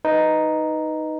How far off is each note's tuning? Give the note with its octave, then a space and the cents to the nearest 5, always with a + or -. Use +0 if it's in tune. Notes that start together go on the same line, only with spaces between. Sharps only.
D#4 +0 B4 +0